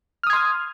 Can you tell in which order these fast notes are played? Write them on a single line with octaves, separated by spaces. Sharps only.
F6 D#6 G#6 C6